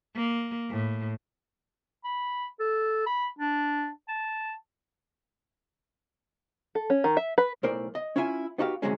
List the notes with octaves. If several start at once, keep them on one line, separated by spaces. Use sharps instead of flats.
A#3
A2
B5
A4
B5
D4
A5
A4
C#4
D#3
E5
B4
B1 A2 A#4 C5 D5
D#5
C#4 E4 F4 E5 G#5
B3 D#4 F#4 G4 F5
D2 G#2 C3 F#3 G#3 C#4